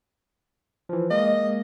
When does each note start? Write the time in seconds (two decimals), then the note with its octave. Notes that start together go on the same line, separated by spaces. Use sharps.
0.89 E3 F3
1.10 G#3 A#3 D#5